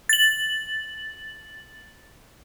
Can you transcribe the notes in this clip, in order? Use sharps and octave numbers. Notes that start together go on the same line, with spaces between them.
A6 F#7